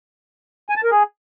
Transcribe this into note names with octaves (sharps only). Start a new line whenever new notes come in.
G#5
A5
A#4
G#4